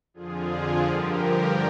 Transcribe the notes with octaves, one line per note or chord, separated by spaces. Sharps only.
F2 D3 F3 F4 G#4
G2 D3 F3 G4 A#4